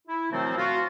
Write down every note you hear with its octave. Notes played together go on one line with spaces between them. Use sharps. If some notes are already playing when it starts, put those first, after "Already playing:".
E4
B2 D#3 F3 F#3 A3 C4
F4 F#4